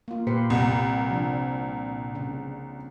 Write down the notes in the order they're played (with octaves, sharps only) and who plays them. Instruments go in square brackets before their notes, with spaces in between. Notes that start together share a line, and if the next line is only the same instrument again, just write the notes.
[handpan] A#3 F4
[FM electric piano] A#2 [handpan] G4 B4 C5
[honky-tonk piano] C2
[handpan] F3 D4
C#3